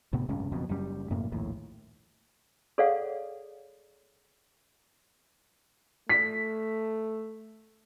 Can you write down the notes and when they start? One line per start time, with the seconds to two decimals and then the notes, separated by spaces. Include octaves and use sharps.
0.13 D2 A2 C3 B3
0.29 F1 C#2 G2 C#4
0.52 F#1 F2 B2
0.69 F#1 F#2 G3 C#4
1.10 F1 F#2 A2 A#3
1.32 A#1 D#2 A2
2.78 G#4 A4 C#5 D5 F5 F#5
6.09 A3 B6